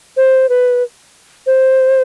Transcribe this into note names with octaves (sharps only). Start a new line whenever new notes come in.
C5
B4
C5